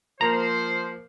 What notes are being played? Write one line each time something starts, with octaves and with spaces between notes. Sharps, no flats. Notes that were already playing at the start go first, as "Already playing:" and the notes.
F3 A#3 C5 A#5